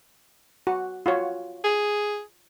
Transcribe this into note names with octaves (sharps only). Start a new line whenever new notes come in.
F#4
F4 F#4 C#5
G#4